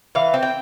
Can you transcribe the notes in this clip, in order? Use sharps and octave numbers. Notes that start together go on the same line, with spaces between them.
E3 F5
C4
G5